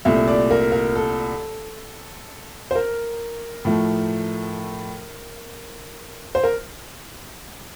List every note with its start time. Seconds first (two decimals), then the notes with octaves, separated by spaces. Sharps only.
0.05 C2 A#2 A3 E5
0.28 D5
0.51 A#4
0.72 A#4
0.96 A4
2.71 C5
2.75 A#4
3.65 A2 F3 A3
6.35 C5
6.44 A#4